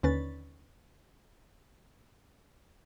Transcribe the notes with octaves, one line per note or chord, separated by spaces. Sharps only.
D#2 D3 C#4 B4 A6